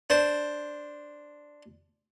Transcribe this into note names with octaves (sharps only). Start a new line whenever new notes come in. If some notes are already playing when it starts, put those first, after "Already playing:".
D4 C5